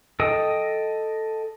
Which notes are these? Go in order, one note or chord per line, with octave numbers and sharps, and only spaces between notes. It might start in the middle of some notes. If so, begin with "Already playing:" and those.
A4 D#5 G5 D#6